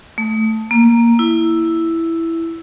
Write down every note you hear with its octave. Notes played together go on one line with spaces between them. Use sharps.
A3
A#3
E4